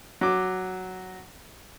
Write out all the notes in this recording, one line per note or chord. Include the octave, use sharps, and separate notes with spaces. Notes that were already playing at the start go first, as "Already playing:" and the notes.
F#3 D6